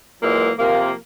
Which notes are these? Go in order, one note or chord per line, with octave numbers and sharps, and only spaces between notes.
A#2 E3 F#3 G#3 A#3
C3 F3 A#3